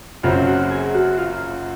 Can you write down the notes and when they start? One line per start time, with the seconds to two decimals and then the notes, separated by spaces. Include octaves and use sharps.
0.23 F#1 F#2 C#3 F#3 C4 F4
0.47 F#4
0.71 G#4
0.95 F#4
1.18 F4